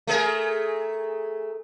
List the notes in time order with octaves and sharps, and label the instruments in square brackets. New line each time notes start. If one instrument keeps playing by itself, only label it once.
[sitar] A3 G#4 A#4